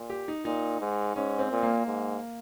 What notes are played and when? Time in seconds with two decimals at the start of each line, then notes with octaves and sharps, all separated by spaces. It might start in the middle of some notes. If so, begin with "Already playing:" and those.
Already playing: A#2
0.10 G4
0.28 D#4
0.45 A#2 D#4
0.80 G#2
1.16 G#2 C#4
1.39 C4
1.51 A#2
1.63 A#3
1.86 G#2